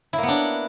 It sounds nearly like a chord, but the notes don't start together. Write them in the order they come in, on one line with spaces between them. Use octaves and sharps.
E4 A#3 B3 D4